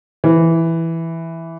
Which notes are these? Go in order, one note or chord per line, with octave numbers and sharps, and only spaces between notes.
E3